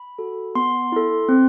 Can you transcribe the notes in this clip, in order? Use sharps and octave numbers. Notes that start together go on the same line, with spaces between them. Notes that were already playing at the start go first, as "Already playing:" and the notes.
Already playing: B5
F#4 A4
B3 C6
E4 A4
C4